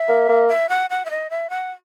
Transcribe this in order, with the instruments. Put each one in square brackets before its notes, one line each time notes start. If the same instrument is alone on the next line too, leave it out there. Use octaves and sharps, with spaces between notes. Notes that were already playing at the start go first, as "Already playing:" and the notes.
Already playing: [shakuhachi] E5
[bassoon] A#3
A#3
[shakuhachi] E5
F#5
F#5
E5
D#5
E5
F#5